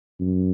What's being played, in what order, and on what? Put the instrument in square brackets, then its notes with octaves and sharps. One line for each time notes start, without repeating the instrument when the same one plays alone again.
[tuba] F#2